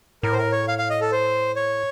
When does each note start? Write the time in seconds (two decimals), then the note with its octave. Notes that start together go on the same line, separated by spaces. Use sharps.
0.23 A2 A#4
0.33 C5
0.38 A#4
0.52 C#5
0.68 F5
0.78 F5
0.90 D#5
1.01 A4
1.12 C5
1.56 C#5